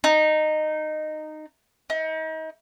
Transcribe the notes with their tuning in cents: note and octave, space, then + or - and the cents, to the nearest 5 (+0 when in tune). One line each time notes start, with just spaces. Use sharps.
D#4 -15
D#4 +35